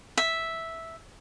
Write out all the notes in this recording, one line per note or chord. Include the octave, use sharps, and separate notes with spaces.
E5